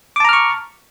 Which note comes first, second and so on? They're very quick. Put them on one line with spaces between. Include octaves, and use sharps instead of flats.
D6 A5 A#5 F6 C#6